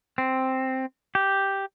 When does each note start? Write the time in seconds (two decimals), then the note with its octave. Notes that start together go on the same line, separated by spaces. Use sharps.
0.18 C4
1.15 G4